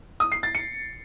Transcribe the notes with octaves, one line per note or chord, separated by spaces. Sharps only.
D#6
C7
A6
C#7